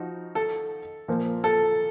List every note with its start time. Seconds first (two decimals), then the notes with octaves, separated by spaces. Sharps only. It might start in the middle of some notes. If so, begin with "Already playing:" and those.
Already playing: F3 D#4 F#4
0.35 A4
1.08 A#2 F3 A#3
1.44 A4